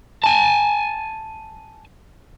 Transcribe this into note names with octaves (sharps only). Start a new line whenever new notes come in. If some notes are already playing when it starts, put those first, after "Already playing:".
G#5 A5